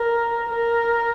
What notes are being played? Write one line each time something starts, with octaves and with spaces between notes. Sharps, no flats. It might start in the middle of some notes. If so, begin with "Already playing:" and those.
Already playing: A#4
A#4